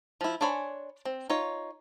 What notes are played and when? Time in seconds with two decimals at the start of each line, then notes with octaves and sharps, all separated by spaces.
0.21 F3 E4
0.41 D4 C5 C#5 G#5 B5
1.05 C4
1.30 D#4 F4 C#5